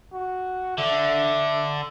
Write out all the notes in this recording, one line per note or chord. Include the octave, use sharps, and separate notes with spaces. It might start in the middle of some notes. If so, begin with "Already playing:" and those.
F#4
D3 E5